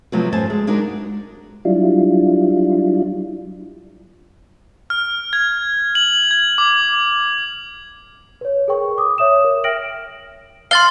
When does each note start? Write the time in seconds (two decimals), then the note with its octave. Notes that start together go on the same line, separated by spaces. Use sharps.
0.12 C3 F3 F#3 A3 B3 C4
0.32 F#2 A2 C5 G#5 A5
0.50 G#3
0.67 G#3 D4 D#4 F#4 G#4 A#4
1.65 F#3 G3 D4 E4 F4
4.90 F6
5.33 G#6
5.95 F#7
6.31 G#6
6.58 D6
8.41 B4 C#5
8.68 G#4 A#4 B4 G5 C#6
8.98 D6 D#6
9.18 C#5 E5 D#6 E7
9.44 A#4
9.64 E5 G5 F6 A#6 D7 F#7
10.71 F5 C6 A6 G7